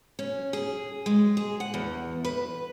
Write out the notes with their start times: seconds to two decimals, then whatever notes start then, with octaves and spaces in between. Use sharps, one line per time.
0.19 C#4
0.53 G#4
1.06 G#3
1.37 G#4
1.60 F#5
1.74 E2
2.25 B4